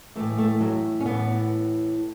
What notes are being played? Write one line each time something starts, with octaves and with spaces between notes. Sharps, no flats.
A2 E3 A3
A3
F#3
C#4
A2 E3 B3